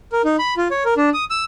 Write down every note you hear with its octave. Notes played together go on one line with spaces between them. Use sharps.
A#4
D#4
B5
F4
C#5
A#4
D4
D#6
E6